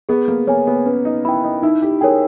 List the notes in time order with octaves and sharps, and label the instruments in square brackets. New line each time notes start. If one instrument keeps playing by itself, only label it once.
[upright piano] B3 [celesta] G#4
[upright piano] A#3
[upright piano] A#3 [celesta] C#5 G#5
[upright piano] B3
[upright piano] C#4 [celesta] B4
[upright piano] D#4
[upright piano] E4 [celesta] G5 B5
[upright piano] D#4
[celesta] D#4 [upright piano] E4
[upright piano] G4
[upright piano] G#4 [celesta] A#4 C#5 G5